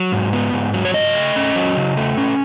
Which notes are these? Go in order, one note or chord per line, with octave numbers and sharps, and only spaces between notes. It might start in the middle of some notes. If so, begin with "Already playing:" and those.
Already playing: F#3
G#2
B3
G#2
F#3
C#5
C#3 D#5
A3
C#4
F#3
C#3
A3
C#4